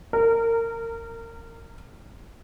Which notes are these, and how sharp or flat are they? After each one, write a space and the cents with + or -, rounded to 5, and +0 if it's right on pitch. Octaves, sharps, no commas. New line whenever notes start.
A#4 -25